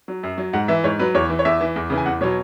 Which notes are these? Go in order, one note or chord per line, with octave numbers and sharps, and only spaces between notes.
F#3
F#2
F#3
G#2 F#5
E3 E5
G#2 C#5
F#3 B4
E2 C#5
E3
C#5
E2 E5
E3
E2
C#3 E3
G#5
E2 F#5
B2 F#3 C#5